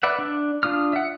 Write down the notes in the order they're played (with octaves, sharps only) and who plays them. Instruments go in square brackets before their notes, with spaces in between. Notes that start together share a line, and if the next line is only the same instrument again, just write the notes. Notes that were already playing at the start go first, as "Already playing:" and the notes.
[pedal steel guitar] B4 D5 E5 F#5
D4
D4 F4 D#6 F6
E5 F#5